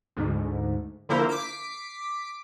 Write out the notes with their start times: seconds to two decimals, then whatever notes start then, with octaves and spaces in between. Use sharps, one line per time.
0.17 D2 G#2
1.09 D3 F3 A#3 E4 A#4 C5
1.29 D6 B6 C7 D7